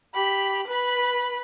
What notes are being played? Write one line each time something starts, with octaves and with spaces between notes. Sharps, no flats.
G4 B5
B4 B5